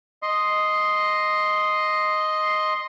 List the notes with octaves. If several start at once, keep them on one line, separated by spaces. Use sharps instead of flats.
D#5 C6